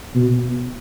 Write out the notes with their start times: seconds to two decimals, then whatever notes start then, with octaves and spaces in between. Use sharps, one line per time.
0.15 B2